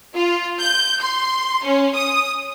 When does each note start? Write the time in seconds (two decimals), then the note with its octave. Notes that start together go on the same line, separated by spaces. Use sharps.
0.16 F4
0.62 G6
1.01 C6
1.65 C#4
1.96 D#6